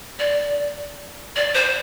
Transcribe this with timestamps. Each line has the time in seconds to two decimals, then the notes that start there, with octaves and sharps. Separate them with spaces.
0.19 D5
1.36 D5
1.55 C5